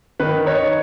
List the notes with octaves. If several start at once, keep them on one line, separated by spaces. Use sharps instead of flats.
D#3 B4
D#4 C#5